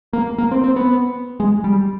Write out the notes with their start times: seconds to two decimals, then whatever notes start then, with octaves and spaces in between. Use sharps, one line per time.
0.13 A#3
0.38 A#3
0.51 C4
0.64 C4
0.76 B3
1.40 G#3
1.64 G3